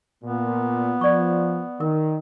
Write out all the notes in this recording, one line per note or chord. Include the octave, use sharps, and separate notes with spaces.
A#2 B3
F3 D5 C#6
D#3 A#4